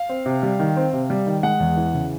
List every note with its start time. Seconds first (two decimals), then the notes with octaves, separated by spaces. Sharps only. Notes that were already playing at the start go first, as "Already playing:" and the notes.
Already playing: F5
0.09 C4
0.26 C3
0.43 G3
0.59 D#3
0.77 C4
0.93 C3
1.10 G3
1.26 D#3
1.43 G#3 F#5
1.60 E2
1.77 E3
1.94 C#3